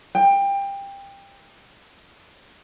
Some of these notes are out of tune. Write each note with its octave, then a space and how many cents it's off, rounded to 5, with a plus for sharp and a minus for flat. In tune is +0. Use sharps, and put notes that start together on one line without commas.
G5 +20